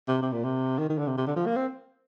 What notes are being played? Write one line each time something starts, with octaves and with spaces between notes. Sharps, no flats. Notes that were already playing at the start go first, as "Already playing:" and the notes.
C3
C3
A#2
C3
D#3
D#3
D3
C3
C3
D3
F3
A#3
C4